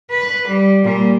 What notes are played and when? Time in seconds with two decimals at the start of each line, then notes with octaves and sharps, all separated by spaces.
0.11 B4
0.48 G3
0.84 A#2 G3